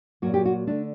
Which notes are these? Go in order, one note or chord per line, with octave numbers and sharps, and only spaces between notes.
A#2 F#3 A#3 F#4
G4
F#4
D3 A3 D4